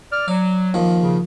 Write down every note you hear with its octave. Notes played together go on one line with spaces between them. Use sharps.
D5 F6
F#3 D5
D#2 F3
C#3